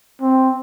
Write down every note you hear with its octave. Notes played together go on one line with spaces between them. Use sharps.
C4